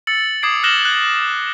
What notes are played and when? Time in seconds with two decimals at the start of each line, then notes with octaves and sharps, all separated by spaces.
0.07 E6 A6 C#7 F#7
0.43 D6 D#6 G#6 C7 D7
0.63 F6 F#6 A#6 E7 F#7 G7
0.85 F#6 G#6